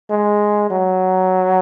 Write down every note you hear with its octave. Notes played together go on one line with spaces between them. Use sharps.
G#3
F#3